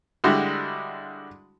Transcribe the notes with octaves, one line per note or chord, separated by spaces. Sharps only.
D3 G3 G#3 E4 F#4